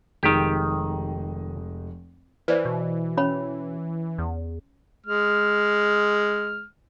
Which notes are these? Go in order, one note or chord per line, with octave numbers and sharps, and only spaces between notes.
F1 D#3 G#3 D#4 G4
E3 B4 C5 D5
B2
C#4 C#5 B5
E2
G#3 F6